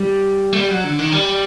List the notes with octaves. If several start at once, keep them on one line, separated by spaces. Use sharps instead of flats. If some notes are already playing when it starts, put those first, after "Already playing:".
Already playing: G3
A3
G3
F#3
D3
D#3
G3